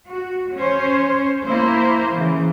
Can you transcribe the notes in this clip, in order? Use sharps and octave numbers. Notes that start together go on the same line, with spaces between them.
F#4
C#4 C5 C#5
A#3 E4 C5
C#3 E3